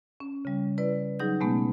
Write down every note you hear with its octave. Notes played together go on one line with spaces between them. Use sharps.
C#4
C#3 G3
E4 B4 D5
F#3 D#4 G#4 G6
B2 G#3 A3 B3 C#4